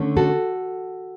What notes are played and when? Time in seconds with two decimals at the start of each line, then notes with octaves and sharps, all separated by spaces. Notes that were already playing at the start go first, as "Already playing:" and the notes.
Already playing: D3 A3 C#4
0.17 F#4 A4